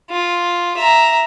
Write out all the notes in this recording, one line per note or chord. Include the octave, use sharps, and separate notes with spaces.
F4
E5 A#5